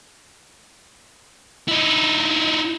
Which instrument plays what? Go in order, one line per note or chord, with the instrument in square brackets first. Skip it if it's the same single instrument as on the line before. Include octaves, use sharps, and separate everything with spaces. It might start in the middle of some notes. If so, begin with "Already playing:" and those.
[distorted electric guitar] D#4 E4